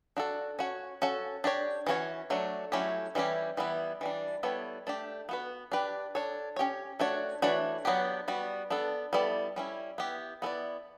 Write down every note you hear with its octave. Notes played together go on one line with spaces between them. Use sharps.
D4 F#4 A4
C#4 F#4 C#5
C#4 F#4 A4
D4 G4 C#5
E3 A3 C#4 F#4 C#5
F#3 A3 D4
F#3 A3 C#4 E4 G4
E3 G3 C#4 E4 G4
E3 G3 B3 E4
E3 G3 D4
G3 B3 E4 A4 C#5
A3 D4 G4
B3 F#4 B4
D4 G4 B4
D4 A4 C#5
C#4 G4 C#5
A3 D4 F#4 C#5
E3 A3 D4 F#4 C#5
F#3 B3 D4 G4
G3 B3 F#4
B3 D4 A4
G3 B3 E4 A4 D5
G3 C#4 E4
B3 E4 G4
B3 E4 A4 D5